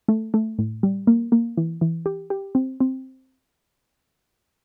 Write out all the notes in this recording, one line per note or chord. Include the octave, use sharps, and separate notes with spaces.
A3
A3
A2
G3
A#3
A#3
E3
E3
G4
G4
C4
C4